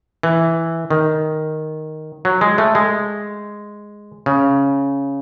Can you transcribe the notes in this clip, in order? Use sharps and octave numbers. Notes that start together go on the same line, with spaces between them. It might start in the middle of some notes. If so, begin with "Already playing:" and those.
E3
D#3
F#3
G#3
A3
G#3
C#3